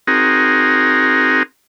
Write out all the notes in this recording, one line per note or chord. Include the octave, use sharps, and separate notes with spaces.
C4 D#4 F#4 G#4 A#4